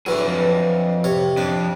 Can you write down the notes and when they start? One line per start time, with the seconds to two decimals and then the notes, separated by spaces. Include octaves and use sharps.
0.06 D3 E3 F#3 G#4 B4
0.26 F2
1.04 C3 C#5
1.37 F2 D4